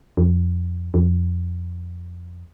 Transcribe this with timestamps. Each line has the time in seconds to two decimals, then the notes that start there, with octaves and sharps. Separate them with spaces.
0.17 F2
0.94 F2